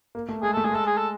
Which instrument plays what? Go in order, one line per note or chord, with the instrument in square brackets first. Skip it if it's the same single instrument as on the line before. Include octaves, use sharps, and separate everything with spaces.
[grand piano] A#3
A3
[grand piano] G#3 [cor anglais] G#4
[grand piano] A3 [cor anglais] A4
[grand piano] A3 [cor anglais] G#4
[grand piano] G#3 [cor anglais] A4
[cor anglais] G#4
A4